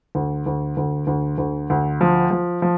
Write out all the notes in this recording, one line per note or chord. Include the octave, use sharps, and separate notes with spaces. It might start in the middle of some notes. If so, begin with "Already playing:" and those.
D2
D2
D2
D2
D2
D2
F3
F3
F3